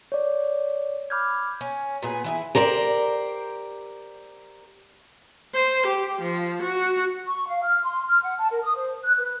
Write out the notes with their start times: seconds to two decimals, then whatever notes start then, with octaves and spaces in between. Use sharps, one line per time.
0.12 C#5 D5
1.10 B5 D6 F6 G6 G#6
1.61 C#4
2.02 A#2 B3 G#4
2.24 E3 E4 G#4
2.55 G4 A#4 C5 D5
5.54 C5
5.86 G4
6.21 F3
6.63 F#4
7.27 C#6
7.47 F5
7.63 F6
7.83 C6
8.08 F6
8.23 F#5
8.37 A5
8.50 A#4
8.62 D#6
8.75 C5
9.02 F#6
9.18 B4